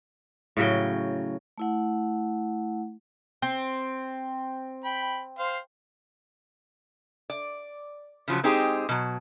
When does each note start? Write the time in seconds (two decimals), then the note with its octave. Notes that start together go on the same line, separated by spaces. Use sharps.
0.57 A2 C#3 F#3 G5
1.58 A3 E4 F#5
3.42 C4
4.84 G5 B5
5.39 C5 F5
7.30 D5
8.28 C#3 F3 F#3
8.43 G#3 C4 D#4 G4 G#4
8.89 B2 F#3